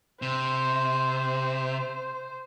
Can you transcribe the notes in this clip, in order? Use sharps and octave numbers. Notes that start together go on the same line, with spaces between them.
C3 C5